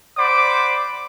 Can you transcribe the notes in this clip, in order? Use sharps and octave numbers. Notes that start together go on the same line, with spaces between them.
C5 D5 F#5 B5 D6